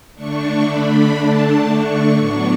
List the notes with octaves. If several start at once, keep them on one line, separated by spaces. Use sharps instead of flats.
D3 A3 D4 C#6
B5
A5
C#6
A2 F#3 B3 D4 C#6